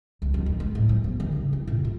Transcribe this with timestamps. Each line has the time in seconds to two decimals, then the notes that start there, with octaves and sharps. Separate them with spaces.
0.22 C#2
0.34 F2
0.46 A1
0.60 G#3
0.75 A2
0.89 F3
1.04 B3
1.20 D#3
1.32 C#3
1.53 E4
1.67 A#2
1.85 F4